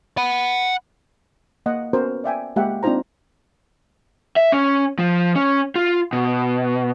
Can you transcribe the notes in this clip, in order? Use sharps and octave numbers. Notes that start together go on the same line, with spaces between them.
F#5 B5
A#3 D#5 F#5
B3 C#4 F#4 A#4 C5
D5 E5 G5 G#5
G#3 A#3 G4 E5 F#5
C4 D4 D#4 F4 C5 A#5
E5
C#4
F3
C#4
F4
B2